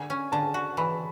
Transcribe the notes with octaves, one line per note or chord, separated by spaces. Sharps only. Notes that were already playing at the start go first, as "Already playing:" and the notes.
Already playing: D3 G#5
C#4
D3 A5
F#4
E3 B5